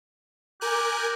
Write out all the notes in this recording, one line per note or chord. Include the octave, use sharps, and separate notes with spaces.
G4 A#4 G#5 F#6